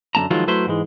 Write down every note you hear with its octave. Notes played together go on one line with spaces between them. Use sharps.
F#2 D3 B3 A5 A#5
D#3 F3 F#3 G#3 E4 F4
F#3 A3 E4 B4 C5
G#2 E3 G#3